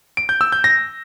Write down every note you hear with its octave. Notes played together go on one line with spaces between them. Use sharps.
D7
G6
E6
G6
A#6